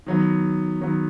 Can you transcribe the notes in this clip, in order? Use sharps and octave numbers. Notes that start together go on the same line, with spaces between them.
D#3 F#3 B3
D#3 F#3 B3